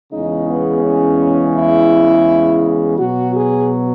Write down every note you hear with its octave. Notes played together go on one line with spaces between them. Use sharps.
E2 C#3 G#3 D#4
B3
C#4
E4
B2 F#3 F#4
G#4